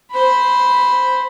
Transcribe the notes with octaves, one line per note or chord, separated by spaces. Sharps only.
C5 B5